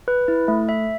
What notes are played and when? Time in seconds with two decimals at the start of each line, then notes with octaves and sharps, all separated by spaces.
0.08 B4
0.28 E4
0.48 A3
0.69 E5